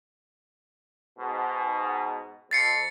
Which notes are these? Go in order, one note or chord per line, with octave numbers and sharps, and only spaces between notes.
G#2 B2
F2 A6 C7 C#7